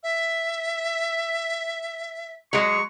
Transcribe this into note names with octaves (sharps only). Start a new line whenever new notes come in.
E5
F#3 G#3 C#6